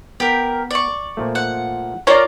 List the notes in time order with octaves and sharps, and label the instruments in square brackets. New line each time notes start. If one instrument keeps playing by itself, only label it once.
[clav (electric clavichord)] B3 [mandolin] G4 A#4
[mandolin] D5 C#6
[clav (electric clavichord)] A#2 F3 A3
[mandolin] F#5
[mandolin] A#3 F4 A#5 [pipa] C#5 D5